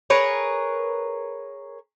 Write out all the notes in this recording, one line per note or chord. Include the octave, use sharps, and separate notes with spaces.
G#4 A#4 B4 C#5